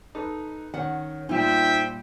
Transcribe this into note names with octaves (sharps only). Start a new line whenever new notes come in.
D#4 A4 B4
D#3 C#4 F#5
A#2 G3 D#4 F4 C5 E5 G5